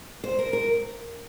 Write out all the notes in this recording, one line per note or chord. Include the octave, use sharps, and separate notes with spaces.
C5
A#4
A#4